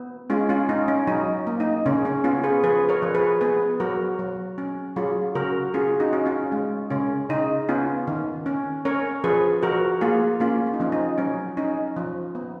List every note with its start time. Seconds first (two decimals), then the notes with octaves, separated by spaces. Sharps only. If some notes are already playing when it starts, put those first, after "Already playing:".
Already playing: B3
0.30 G#3 C#4 F4
0.49 C#4 F4
0.69 C#4 D#4
0.88 C#4
1.07 F#3 D#4
1.47 A#3
1.60 D#4
1.86 C#3 C#4
2.05 C#4
2.24 B3 C#4 F4
2.44 G#4 B4
2.63 F3 G#4 B4
2.89 A#4 C#5
3.02 F3
3.15 G#4 B4
3.41 B3 G#4 B4
3.80 F#3 F#4 A#4
4.19 F#3
4.58 C#4
4.96 F#3 F4 G#4
5.35 C#3 F#4 A#4
5.74 C#4 F4 G#4
6.00 D#4 F#4
6.13 C#4
6.26 C#4 F4
6.52 G#3
6.90 C#3 C#4
7.29 C#3 D#4
7.69 B3 C#4 F4
8.08 D#3
8.46 C#4
8.85 C#4 A#4 C#5
9.24 F3 G#4 B4
9.63 F3 F#4 A#4
10.01 A#3 F4 G#4
10.40 A#3 C#4 F4
10.66 C#4
10.74 D#4
10.80 F3 C#4
10.92 D#4
11.18 F#3 C#4
11.57 C#4 D#4
11.96 F3
12.35 B3